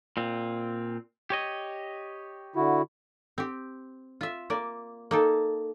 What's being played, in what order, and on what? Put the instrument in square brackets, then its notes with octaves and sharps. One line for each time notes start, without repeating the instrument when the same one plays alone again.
[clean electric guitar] A#2 C4
G4 C#5 D#5
[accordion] D3 E4 F#4
[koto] C4 G4
F4 E5
A#3 D5
A#3 D#4 A4